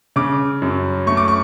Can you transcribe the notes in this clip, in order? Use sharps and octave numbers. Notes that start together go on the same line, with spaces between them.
C#3 D6
F#2
A3 C#6
D6
C#6